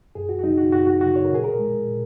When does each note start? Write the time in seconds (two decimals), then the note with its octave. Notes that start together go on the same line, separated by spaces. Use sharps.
0.15 F#2 G#4
0.29 F#4
0.39 F#4
0.43 C#3 F#3 D#4
0.58 F#4
0.72 F#2 F#4
0.87 F#4
1.01 C#3 F#3 F#4
1.16 C#5
1.25 A#4
1.30 A#2 G#4
1.44 A#4
1.59 G#3
1.88 A#2